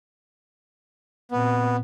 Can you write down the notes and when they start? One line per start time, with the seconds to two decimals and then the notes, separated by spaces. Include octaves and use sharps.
1.31 A#2 B3 C4